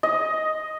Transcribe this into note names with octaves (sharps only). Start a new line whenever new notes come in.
D#5